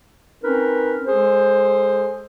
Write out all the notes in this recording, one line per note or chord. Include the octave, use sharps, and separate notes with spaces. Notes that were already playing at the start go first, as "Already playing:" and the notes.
C4 C#4 D#4 A#4 B4
G#3 G#4 A4 C5